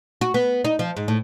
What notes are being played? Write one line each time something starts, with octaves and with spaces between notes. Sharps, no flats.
F#4
B3
D#4
F3
G#2
A2